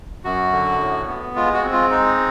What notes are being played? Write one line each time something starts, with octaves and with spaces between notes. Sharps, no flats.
F#2 F#4
D3
A2
B3
G#3 F4
F#4
C4
F4
G#3 D#4